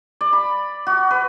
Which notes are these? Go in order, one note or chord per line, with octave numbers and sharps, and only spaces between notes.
D5
B5
F#4
B4